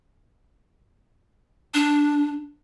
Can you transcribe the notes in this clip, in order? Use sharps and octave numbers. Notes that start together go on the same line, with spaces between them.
D4